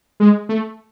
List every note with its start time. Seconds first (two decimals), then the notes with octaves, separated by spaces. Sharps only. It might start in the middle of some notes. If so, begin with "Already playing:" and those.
0.20 G#3
0.49 A3